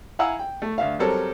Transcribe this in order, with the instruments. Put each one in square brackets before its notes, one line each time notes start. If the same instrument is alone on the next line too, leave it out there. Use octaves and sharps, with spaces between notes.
[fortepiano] E4 F5 F#5 G#5 A#5 E6
G5
A3
D2 E5 F5
F#3 G3 C4 A4 A#4 C#5